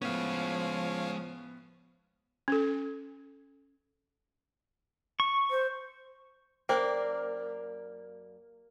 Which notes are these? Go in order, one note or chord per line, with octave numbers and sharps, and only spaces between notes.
A2 F3 G#3 B3 C#4 C#5 F5
C#4 A4
C#6
C5
F#2 A#3 C5 D5 G5